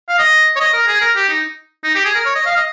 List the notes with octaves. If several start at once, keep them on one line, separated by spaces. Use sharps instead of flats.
F5
D#5
C#5
D#5
A#4
G#4
A#4
G4
D#4
D#4
G4
G#4
A#4
C#5
D#5
F5
D#5